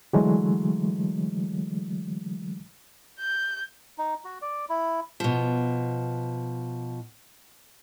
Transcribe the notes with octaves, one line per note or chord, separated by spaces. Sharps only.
D3 E3 F#3 G#3 A3
G6
D#4
F#4
D5
E4
B2 F3